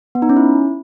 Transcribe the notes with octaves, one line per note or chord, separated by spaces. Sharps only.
B3
D#4
C#4
E4